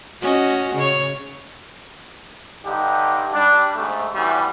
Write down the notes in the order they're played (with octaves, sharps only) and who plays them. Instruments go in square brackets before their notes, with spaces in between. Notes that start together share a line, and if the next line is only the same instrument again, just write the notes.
[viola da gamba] C#4 F#4 D#5
C#3 C#5
[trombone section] G2 D3 D#4 G4
G3 D4
G#2 C3 A3
E2 A2 E3 F#3 G3